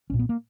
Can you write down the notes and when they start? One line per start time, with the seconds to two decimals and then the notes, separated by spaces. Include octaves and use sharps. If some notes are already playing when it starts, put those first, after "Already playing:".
0.10 B1 A#2 C#4
0.19 B3
0.29 A#3